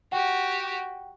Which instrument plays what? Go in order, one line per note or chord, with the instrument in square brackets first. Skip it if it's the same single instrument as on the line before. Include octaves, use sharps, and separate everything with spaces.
[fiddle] F#4 G4 [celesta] F#5 G5